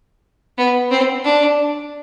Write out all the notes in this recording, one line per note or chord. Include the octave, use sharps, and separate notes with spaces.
B3
C4
D4